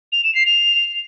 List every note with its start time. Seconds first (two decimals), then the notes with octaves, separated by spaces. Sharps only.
0.12 F7
0.24 E7
0.35 C7
0.46 F7